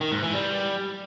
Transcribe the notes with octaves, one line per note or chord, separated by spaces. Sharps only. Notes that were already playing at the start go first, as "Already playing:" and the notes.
D#3
G#2
E3
G3